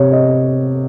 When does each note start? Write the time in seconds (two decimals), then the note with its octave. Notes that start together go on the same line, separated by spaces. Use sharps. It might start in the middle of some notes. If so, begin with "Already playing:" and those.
Already playing: C3 C#5
0.12 D#5